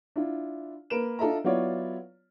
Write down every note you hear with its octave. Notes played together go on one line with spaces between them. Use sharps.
D4 E4 F4
A#3 A#4 B4 D7 E7
D4 F4 A4 D#5 E5 A#5
F#3 B3 E4 F4 C#5 D5